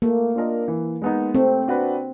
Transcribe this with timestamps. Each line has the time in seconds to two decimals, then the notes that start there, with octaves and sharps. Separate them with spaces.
0.02 A3 A#3
0.35 D4 F4 A#4 D#5
0.68 E3
1.02 G#3 B3 D#4
1.35 A3 C4
1.68 D4 F#4 B4